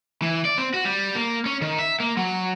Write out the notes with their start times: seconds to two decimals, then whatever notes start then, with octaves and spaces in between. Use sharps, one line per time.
0.22 E3
0.45 D5
0.58 C4
0.74 F#4
0.85 G3
1.15 A#3
1.46 C#4
1.62 D#3
1.79 E5
2.00 A#3
2.17 F#3